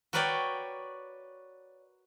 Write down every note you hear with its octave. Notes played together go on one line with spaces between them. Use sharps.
F#4 A#4 B4 C#5 D5 G5